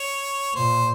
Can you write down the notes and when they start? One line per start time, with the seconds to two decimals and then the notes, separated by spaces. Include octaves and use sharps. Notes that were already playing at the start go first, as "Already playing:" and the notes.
Already playing: C#5
0.54 A#2 C5